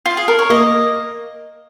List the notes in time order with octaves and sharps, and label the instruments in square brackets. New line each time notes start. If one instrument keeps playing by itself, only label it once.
[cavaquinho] F4
G#4
A#4
C#5
[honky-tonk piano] A#3 [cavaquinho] D#5